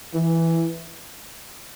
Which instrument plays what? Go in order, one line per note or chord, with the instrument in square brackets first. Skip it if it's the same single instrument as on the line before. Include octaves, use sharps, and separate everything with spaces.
[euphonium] E3